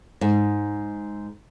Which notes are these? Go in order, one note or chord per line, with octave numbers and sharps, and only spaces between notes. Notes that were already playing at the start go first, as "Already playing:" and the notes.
G#2